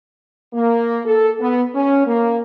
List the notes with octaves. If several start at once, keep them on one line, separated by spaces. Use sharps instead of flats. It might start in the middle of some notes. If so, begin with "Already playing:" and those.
A#3
A4
B3
C#4
A#3